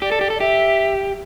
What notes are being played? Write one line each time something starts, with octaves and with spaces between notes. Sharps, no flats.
G4 D5
A4
G4
A4
D5
G4 E5